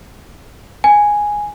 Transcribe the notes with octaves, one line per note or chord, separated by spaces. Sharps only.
G#5